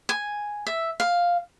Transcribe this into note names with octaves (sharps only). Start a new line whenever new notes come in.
G#5
E5
F5